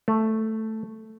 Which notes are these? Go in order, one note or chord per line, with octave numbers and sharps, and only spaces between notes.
A3